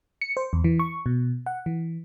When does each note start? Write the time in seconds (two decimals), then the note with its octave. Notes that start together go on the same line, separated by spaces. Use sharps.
0.22 C#7
0.37 C5
0.53 E2
0.64 E3
0.79 C#6
1.06 B2
1.46 F#5
1.66 E3